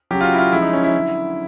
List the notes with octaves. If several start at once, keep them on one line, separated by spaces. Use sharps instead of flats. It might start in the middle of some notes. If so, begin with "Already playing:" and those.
C#3 F#3 G4
F4
F#4
E4
F4
C#3 F3 G#3 E4
D#4
C#4
E4
D3 F#3